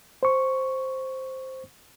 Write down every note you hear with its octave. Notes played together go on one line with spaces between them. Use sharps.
C5 C#6